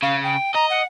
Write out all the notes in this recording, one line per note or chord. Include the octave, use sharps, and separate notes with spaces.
C#3 F5
G5
D#5 A#5
F#5